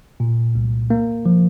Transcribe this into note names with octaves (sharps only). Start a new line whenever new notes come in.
A#2
C2
A#3
F3